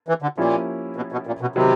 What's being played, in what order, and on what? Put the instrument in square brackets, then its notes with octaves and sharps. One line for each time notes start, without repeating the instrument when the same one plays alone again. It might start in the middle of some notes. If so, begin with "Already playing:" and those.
[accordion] E3
D3
[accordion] A#2 [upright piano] F3 A#3 C#4 E4 G4
[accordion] B2
B2
A#2
B2
[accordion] C3 [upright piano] D#3 F#3 B3